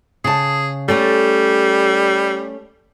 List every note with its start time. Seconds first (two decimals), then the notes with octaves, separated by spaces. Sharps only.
0.24 C#3 G#4 A5
0.88 G3 A3 C#4 A4